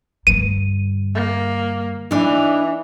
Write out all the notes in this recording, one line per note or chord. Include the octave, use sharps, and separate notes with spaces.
G2 D3 D#7
A#3
E3 D4 D#4